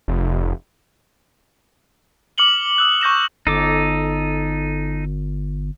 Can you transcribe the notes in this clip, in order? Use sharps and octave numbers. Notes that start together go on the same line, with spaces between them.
F1
D6 F6 C#7 F#7 G7
D#6 E6 F#6
C#6 G6 A#6 E7
G1 D#4 A4 D6